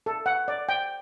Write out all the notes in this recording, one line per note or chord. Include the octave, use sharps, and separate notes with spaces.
A4
F#5
D5
G5